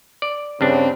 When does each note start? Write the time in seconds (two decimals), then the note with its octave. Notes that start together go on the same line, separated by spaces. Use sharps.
0.22 D5
0.61 G2 C#3 C4 D4